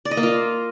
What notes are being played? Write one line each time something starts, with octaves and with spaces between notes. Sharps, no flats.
D5
D#5
A#3
F4